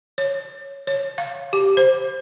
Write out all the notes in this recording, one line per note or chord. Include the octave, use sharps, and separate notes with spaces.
C#5
C#5
F5
G4
C5